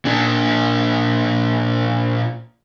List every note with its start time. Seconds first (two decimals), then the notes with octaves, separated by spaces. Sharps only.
0.05 A#2 D4